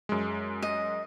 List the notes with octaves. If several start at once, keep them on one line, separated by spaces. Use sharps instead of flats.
F#2 G#3
D#5